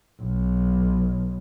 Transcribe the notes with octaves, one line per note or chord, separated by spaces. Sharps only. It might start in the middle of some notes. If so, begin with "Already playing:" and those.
B1